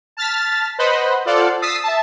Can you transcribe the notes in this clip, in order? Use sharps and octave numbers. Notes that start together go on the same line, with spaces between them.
A5 F6 A6 B6
B4 C5 D#5 F#5 B5
F4 A4 C5 D5 F5 F#5
D#6 E6 A6 B6 C7
E5 A5